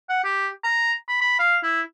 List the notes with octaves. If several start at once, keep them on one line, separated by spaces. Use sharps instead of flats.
F#5
G4
A#5
B5
B5
F5
E4